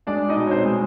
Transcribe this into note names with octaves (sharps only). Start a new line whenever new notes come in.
G#3 D4 D5
D#4 D#5
B2
C#5
C4 C5
G#3